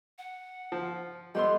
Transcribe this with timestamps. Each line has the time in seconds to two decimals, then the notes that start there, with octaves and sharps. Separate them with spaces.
0.18 F#5
0.72 F3
1.35 G3 B3 A4 D#5 C6